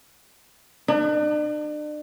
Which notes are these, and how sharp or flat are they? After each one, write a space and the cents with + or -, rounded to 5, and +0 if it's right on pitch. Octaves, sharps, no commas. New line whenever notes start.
D4 +40